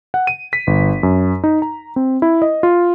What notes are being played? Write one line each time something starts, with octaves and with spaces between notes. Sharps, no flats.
F#5
D#7
B6
G1
F#2
D#4
A#5
C4
E4
D#5
F4